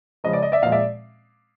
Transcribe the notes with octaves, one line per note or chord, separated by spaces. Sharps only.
C#3 F3 G#3 D#5
D5
D#5
D5 E5
A#2 F3 G#3 D#5 F5
D5 E5